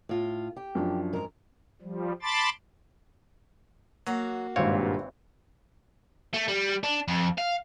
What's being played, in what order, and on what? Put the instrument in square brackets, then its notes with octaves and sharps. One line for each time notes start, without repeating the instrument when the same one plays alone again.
[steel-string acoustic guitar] A2 F4
G4
[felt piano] F#2 F3 D4
[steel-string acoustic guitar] G#2 A#4
[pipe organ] F3 G3
A5 B5 C6 D6 A6
[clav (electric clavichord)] F#3 [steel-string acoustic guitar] A#3 F#4
[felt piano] G#1 F5 [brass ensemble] G2 A#2 [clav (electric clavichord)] E3 C4 C#5
[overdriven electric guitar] A3
G3
D4
F2
F5